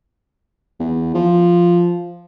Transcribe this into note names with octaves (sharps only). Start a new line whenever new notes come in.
E2
F3